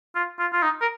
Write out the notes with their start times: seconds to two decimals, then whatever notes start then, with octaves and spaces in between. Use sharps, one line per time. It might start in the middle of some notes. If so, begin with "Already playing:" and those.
0.15 F4
0.39 F4
0.53 F4
0.62 D#4
0.81 A#4